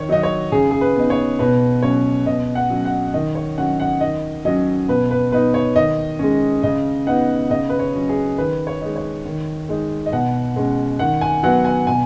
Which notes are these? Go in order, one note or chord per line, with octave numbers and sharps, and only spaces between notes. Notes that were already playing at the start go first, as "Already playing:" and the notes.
Already playing: D#3 C#5
F#3 D#4 D#5
C#5
C#3 G#4
G#4
B4
B3 D#4
C#5
B2 B4
F#3 C#4 C#5
B2 D#5
F#5
F#3 C#4
F#5
D#3 D#5
C#5
F#3 C#4 F#5
F#5
D#3 D#5
F#3 C#4 D#5
B2 B4
B4
B3 D#4 B4
C#5
D#3 D#5
G#3 C#4
C#3 D#5
B3 D#4 F#5
C#3 D#5
B4
C#5
F#3 C#4
G#4
D#3 B4
C#5
G#3 D#4
C#5
D#3
G#3 D#4
D#5
B2 F#5
G#3 C#4
D#3 F#5
G#5
F#3 B3 F#5
G#5
B2 G#5